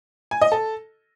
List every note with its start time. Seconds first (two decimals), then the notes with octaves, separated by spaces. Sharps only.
0.31 G#5
0.41 D#5
0.52 A4